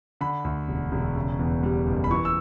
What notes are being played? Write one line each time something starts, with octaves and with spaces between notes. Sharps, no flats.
D3 B5
D2
E1
E1
C#3
E2
G3
F#1
B5
E3 C#6
E6